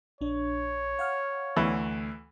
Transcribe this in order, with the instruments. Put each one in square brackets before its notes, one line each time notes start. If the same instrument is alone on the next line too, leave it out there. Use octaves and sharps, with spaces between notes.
[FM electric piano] A#1 D4 [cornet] C#5
[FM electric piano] F5 F#5 F6
[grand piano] D2 [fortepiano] E3